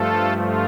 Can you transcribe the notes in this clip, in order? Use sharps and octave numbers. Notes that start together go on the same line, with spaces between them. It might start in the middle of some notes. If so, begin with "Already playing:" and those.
Already playing: G2 F3 A3 F4 A4
F4